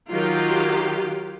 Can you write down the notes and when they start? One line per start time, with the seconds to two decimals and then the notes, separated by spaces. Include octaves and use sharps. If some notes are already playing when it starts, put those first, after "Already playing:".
0.10 D#3 F#3 F4 G4